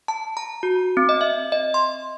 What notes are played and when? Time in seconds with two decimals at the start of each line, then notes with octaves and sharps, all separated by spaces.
0.08 A5
0.37 A#5
0.63 F#4
0.97 C4
1.09 D#5
1.21 E5
1.52 D#5
1.74 C6